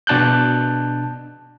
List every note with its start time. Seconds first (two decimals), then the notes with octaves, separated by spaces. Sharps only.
0.07 B2 D4 A5 F#6 G6